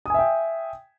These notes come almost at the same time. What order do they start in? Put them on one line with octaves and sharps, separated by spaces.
D#6 G#5 E5 G5